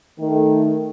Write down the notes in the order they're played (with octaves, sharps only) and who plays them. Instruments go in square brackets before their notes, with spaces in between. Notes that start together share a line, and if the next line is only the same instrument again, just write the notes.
[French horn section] D#3 A3